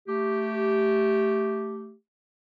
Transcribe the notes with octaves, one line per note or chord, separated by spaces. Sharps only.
A3 G4